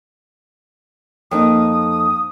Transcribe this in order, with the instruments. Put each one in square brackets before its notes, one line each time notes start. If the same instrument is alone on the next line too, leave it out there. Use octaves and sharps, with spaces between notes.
[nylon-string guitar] F2 A#3 D#4 [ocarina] D#6